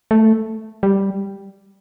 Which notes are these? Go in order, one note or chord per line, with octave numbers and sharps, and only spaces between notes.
A3
G3